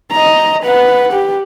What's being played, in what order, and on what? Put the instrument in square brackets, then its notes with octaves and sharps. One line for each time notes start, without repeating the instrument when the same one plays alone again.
[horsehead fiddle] D#5 A#5
B4 F#5
G4